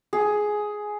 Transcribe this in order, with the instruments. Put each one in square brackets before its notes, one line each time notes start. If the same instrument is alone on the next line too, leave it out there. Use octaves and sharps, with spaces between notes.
[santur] G#4